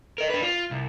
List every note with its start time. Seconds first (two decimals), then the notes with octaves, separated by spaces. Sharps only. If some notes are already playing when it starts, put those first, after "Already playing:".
0.18 A#4 D#5
0.30 D4 B4
0.42 F4
0.71 C2